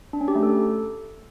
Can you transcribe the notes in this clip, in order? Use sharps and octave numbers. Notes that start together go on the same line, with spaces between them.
D4
C#4
G4
A3
A4